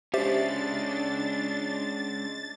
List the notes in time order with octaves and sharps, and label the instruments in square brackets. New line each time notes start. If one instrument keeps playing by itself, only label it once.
[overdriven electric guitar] G#3 C#4 [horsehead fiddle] D4 [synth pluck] G4 C5 E5 [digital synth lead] A6